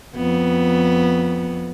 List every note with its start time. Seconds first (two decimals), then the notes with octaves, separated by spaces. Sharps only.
0.16 F2 B3